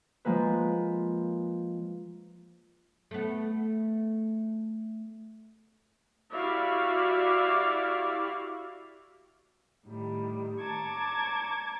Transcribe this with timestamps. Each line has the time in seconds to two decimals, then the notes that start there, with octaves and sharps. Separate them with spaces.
0.25 F3 G#3 A#3 B4
3.11 A3 B3
6.33 E4 F#4 G4 D5 E5 F5
9.85 A2 D#3 G3
10.61 A5 A#5 C#6 D6 G#6